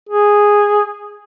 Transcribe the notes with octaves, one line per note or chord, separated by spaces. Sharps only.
G#4